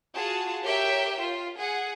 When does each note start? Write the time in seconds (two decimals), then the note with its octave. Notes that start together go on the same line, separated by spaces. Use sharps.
0.16 F4 F#4 G#4 A5
0.63 G4 A#4 C#5 E5 G5
1.22 F4
1.59 G#4 F#5